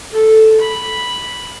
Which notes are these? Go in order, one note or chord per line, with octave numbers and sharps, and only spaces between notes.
A4
B5